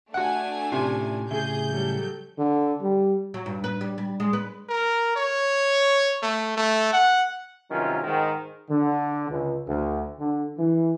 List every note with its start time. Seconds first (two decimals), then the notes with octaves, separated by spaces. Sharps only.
0.14 A3 D4 F#4 F#5 G#5
0.72 A2 C3 C#4 F4
1.31 A2 C#3 G#4 E5 G6
1.69 F#3 G3 A4
2.38 D3
2.82 G3
3.34 F#3
3.46 G2
3.64 B4
3.81 G3
3.98 G3
4.20 G#3
4.33 B4
4.69 A#4
5.16 C#5
6.22 A3
6.57 A3
6.92 F#5
7.70 G2 C3 D#3 F#3 C#4 F4
8.04 G#2 D#3
8.68 D3
9.29 C#2
9.67 D2
10.20 D3
10.58 E3